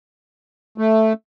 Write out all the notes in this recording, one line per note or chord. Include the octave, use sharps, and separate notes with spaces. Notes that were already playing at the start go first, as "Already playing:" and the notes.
A3